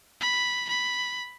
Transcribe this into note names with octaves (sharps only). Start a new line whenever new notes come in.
B5
B5